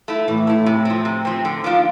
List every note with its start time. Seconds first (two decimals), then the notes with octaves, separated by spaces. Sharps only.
0.08 A3 E4
0.27 A2 E3
0.47 A3 E4
0.66 C3
0.85 F3 C4
1.05 C3
1.25 F3 C4
1.45 D3
1.64 F3 A#3 D4 F4